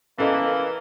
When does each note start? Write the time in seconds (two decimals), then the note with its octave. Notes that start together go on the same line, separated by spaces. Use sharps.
0.18 E3 A#3 C#4 A4 D#5